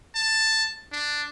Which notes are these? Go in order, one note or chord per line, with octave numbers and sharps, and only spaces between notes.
A5
D4